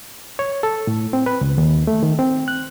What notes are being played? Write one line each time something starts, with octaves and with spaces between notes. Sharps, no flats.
C#5
A4
A2
C4
B4
C#2
D#2
A3
D#3
C4
F#6